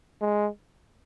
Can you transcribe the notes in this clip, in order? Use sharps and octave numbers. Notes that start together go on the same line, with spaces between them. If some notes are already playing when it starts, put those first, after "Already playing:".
G#3